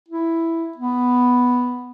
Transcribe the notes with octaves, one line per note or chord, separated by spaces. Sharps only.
E4
B3